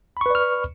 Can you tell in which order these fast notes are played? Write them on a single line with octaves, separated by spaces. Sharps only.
B5 C#6 B4 D5 F6